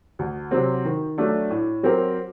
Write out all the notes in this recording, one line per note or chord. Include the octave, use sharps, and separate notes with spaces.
D2
C3 F#3 C4
D#3
F#3 A3 D4
A2
F#3 C4 G4 A#4